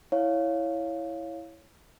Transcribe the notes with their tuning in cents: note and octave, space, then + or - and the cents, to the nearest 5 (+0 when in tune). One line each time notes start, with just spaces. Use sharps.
E4 +0 C#5 +0 F5 +0